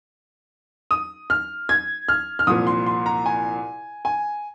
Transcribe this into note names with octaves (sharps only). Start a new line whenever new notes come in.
D#6
F6
G#6
F6
F6
C2 A#2 F3 D#6
C6
C6
A#5
G#5
G#5